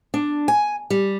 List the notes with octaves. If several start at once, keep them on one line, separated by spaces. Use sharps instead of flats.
D4
G#5
G3